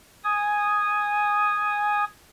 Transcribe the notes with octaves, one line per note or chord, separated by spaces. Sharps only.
G#5 D#6